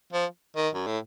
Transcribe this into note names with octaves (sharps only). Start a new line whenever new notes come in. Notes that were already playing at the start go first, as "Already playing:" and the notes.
F3
D#3
F#2
A2